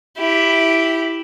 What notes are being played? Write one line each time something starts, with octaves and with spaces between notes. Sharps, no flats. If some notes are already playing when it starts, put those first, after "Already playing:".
E4 G4